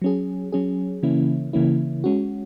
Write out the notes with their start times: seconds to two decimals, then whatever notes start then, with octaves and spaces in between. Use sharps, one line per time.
0.02 F#3 C#4 G#4
0.52 F#3 C#4 G#4
1.03 C#3 E3 A#3 C#4 E4
1.53 C#3 E3 A#3 C#4 E4
2.04 G#3 C#4 F#4